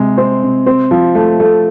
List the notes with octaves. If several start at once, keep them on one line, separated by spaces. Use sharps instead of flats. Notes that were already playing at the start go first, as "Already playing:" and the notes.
Already playing: C3 G#3
C4
C3
C4
F3
A3
A3